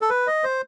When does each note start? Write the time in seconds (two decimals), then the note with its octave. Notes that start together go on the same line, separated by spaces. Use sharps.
0.01 A4
0.10 B4
0.27 D#5
0.44 C5